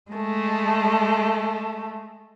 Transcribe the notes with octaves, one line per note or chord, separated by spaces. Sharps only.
G#3 A3